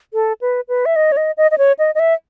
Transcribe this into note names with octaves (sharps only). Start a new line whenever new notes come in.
A4
B4
B4
E5
D#5
C#5
D#5
D#5
D#5
C#5
D#5
D#5
E5